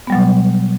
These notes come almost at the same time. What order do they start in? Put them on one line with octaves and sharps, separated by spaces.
B3 G3 F#3 B2